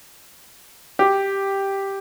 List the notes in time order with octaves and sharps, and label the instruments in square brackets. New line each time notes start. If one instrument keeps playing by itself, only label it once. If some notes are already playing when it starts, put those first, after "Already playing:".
[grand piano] G4